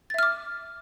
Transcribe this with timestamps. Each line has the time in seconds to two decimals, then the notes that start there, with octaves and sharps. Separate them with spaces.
0.10 A6
0.14 E5
0.19 F6
0.23 D6